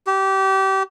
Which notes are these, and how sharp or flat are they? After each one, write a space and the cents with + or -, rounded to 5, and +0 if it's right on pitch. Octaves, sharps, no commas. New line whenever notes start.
G4 -25